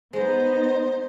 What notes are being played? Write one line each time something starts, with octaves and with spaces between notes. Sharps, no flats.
G#3 B3 D#4 C5